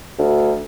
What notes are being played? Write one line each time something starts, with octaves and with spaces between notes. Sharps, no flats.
D2